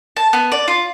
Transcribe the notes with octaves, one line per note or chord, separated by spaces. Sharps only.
A5
B3
D5
F4